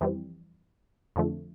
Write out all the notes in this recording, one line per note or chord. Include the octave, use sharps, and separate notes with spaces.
F2 E3 G3 C4
F2 D3 F3 A3